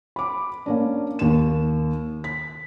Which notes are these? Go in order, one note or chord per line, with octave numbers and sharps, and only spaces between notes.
B5 D6
A#3 C#4 D4
D#2 E7
B6